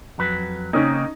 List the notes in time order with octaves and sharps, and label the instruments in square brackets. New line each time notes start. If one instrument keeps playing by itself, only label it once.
[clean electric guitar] F2 F#3 B4
[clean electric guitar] C#3 A#3 C4 [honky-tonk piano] C#4 D#4